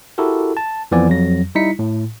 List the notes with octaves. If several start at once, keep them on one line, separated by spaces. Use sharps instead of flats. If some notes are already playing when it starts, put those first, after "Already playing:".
E4 F#4 G4 A4 A#4
A5
F2 E3 F3 B3 D5 G#5
F2 F#3 A#6
G3 D#4 E4 B6 C#7
A2